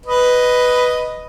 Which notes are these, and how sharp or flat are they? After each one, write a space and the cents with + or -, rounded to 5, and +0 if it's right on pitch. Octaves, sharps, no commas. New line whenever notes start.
B4 +0 D#5 +0